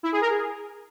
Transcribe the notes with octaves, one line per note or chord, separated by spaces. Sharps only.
E4
G#4
A#4
G#4